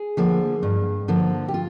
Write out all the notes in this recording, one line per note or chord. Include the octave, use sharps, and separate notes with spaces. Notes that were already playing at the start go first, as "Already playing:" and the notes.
Already playing: G#4
D3 F3 A#3
G2
D3 F3 A#3
G4
F4